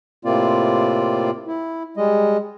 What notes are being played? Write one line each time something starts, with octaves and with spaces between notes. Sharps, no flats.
A2 C3 A#3 C4 F4 D5
E4
G3 G#3 D#5